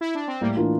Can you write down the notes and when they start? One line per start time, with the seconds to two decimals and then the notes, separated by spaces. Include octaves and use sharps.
0.01 E4
0.15 D4
0.28 C4
0.41 A2 G3 A#3
0.57 E3 A#3 D4 F4